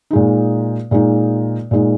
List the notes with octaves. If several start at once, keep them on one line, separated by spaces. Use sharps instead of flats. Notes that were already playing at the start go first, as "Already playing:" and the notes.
A#2 G#3 D#4
A#2 G#3 D#4
A#2 G#3 D#4